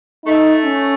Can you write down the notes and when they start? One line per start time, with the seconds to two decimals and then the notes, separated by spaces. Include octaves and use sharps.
0.25 A3 D#4
0.64 C#4